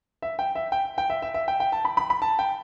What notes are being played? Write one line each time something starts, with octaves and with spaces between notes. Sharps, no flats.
E5
G5
E5
G5
G5
E5
E5
E5
G5
G5
A5
B5
B5
B5
A5
G5